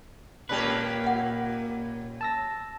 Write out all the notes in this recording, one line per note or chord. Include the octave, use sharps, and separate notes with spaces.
A#2 A#3 C#4 G4 B4
F#5
A5 E6 A#6